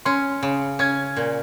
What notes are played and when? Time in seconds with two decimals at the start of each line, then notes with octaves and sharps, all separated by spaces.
0.05 C#4 C6
0.43 C#3
0.79 C#4 G#6
1.17 A#2